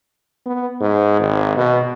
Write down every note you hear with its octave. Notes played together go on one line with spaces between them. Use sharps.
B3
G#2
G#1
B2